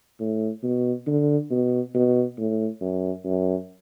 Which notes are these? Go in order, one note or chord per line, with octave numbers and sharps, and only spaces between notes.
A2
B2
D3
B2
B2
A2
F#2
F#2